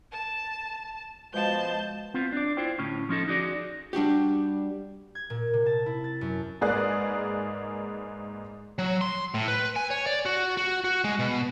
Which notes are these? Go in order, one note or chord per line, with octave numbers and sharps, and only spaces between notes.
A5
B2 F3 G#3 A5 G6
B3 C4 F4
D4 D5
E4 F4 C5 G5
D2 A2 C#4
F3 C#4 D#4 A4
D#4 F#4 G#4 D5
G3 D4 F#4 G4
G#6
A#2
C3
A5
E4
A6
F#2
G#2 A#3 G#4 B4 D5 F#6
F#3
C6
A2
B4
G#5
C#5
D5
F#4
F#4
F#4
G#3
B2